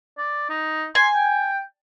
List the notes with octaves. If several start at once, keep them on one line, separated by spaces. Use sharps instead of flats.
D5
D#4
G#5 C6
G5